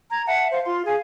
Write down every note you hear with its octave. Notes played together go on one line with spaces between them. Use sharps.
A#5 G#6
E5 F#5 A5
C5 F5
F4 C6
G#4 F5 G#5